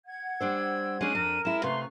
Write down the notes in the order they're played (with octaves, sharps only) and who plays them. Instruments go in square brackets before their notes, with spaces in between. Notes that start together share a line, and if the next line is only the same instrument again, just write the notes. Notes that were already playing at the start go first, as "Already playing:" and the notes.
[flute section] F#5 G#6
[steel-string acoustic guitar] G3 D4 C5 [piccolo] E6
[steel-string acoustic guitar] G#3 D4 [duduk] C#4 [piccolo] D#7
[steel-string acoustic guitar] F2 D4 [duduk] A#4
[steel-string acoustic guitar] G#3 E4 [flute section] F6 [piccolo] E7
[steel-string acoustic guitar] C3 B4 F5 [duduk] A3 [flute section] A#5 C#6 [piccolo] C6